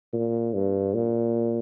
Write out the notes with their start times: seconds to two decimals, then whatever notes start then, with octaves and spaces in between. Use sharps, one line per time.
0.13 A#2
0.54 G2
0.94 A#2